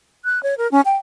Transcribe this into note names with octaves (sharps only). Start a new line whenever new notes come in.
F#6
C#5
A#4
C#4
G5